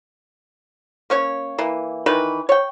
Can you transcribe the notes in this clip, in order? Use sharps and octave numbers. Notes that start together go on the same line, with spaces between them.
A#3 C#4 C#5
E3 A#3
D#3 E3 A#4 B4
C#5 G5